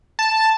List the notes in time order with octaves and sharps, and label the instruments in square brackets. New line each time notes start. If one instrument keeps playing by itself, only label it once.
[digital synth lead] A5